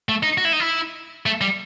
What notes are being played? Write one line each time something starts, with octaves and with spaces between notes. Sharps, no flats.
A3
D#4
F#4
E4
D#4
E4
A3
G3